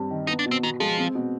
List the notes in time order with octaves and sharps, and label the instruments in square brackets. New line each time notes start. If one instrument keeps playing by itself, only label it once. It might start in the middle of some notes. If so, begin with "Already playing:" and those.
Already playing: [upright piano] G2 G3 C4
D#3
[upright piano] B3 [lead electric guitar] D#4
[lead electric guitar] D4
[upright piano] B2
[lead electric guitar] C4
[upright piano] B2 [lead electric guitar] D#3
[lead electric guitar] F3 [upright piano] G#3
[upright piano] C4
B2